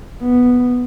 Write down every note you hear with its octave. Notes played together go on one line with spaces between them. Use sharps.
B3